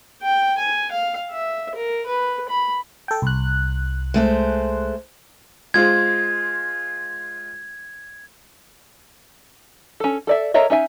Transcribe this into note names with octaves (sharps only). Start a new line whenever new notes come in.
G5
G#5
F5
E5
A#4
B4
B5
A4 G5
C2 F#6
G#3 A3 C5
G#3 F4 C5 G#6
C#4 A4
A4 D5 E5
A4 A#4 C#5 D#5 E5
C#4 D#4 E5 G#5